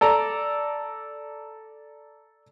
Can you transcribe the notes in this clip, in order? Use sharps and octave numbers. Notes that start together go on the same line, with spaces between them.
A4 D5 A#5